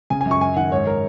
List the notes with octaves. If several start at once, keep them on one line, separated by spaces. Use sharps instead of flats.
C#3 G#5
G#5
F#2
C#6
F#2 G#5
D#3 F#5
G#2 C#5
A#4